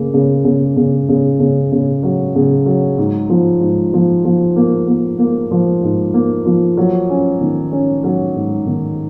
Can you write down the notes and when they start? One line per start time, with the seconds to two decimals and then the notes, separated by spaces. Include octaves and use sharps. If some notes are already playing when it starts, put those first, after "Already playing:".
Already playing: C#3 A#3
0.14 C#3
0.45 C#3
0.77 C#3
1.09 C#3
1.40 C#3
1.72 C#3
2.03 F#3
2.35 C#3
2.66 F#3
2.98 G#2
3.30 F3
3.61 G#2
3.93 F3
4.25 F3
4.56 A#3
4.88 A#3
5.19 A#3
5.51 F3
5.83 G#2
6.14 A#3
6.46 F3
6.77 F#3
7.09 C#4
7.41 D#3
7.72 C#4
8.04 F#3
8.35 G#2
8.66 D#3